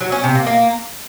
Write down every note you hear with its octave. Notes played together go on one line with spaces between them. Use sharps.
F#3
C#4
C3
A#3
A#3